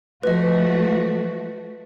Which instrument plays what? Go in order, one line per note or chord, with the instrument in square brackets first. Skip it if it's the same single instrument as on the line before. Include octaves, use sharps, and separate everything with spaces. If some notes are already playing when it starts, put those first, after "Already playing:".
[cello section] F3 A3 F#4 [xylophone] B4 D#5